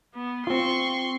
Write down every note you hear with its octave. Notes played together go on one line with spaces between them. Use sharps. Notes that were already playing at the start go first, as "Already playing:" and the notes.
B3
C4 F4 C6 C#6